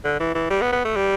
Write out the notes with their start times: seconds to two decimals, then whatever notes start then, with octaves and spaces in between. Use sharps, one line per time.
0.04 D3
0.20 E3
0.35 E3
0.50 G3
0.62 B3
0.72 B3
0.84 A3
0.96 G3